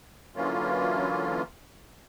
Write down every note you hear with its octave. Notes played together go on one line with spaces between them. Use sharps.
D3 E3 F#3 A#3 C#4 F4